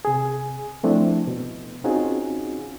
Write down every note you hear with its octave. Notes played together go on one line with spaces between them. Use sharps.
C3 G#4
F3 A3 C4 D4 E4
B2
C4 C#4 D#4 F4 F#4 G#4